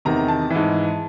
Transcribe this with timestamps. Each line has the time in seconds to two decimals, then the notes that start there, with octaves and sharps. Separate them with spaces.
0.05 E2 C3 D#3 A#5
0.28 A5
0.50 G#2 E3